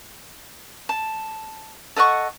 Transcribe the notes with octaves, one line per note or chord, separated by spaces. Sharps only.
A5
A4 D#5 F#5 C#6